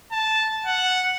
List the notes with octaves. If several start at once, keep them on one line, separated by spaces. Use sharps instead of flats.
A5
F#5